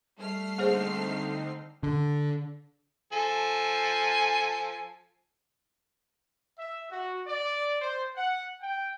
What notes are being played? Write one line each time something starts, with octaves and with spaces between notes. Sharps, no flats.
G3 A3 F6 C7
D3 A#3 C4 D#4 G#4 C5
D3
F3 A4 G#5
E5
F#4
D5
C5
F#5
G5